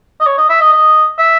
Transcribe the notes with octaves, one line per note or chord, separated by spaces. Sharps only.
D#5
C#5
D#5
E5
D#5
D#5
E5